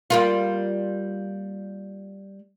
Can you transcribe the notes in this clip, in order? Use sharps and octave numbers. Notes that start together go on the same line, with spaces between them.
G3 A#3 F4